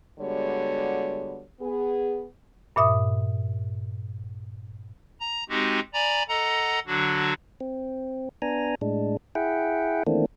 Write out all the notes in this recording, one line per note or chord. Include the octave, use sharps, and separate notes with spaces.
D3 G3 G#3 B3 F#4 C#5
B3 G#4
G2 A#2 E5 D#6
A#5
G#3 C4 D#4 F#4 G4
D5 G#5 A#5 B5
A4 D#5 F#5 A#5
D3 F#3 D4 F#4
C4
B3 D4 G#5 A#5
A2 G#3 D4
E4 G#4 E5 F#5 G5
D#3 E3 A3 A#3 C4 D4